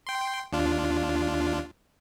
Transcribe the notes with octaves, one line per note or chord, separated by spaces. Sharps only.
G5 C6
D#2 D4 F4